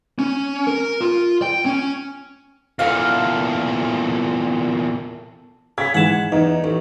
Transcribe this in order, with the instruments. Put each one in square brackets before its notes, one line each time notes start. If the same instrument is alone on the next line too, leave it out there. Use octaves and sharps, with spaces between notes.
[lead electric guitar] C#4
A#4
F4
G5
C#4
[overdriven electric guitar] E2 A#2 [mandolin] A4 F5
[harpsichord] C#3 [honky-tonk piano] G#6 B6
[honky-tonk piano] G#2 E3 [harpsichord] F#5 A5
[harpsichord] E2 [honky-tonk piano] D#4
[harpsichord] A1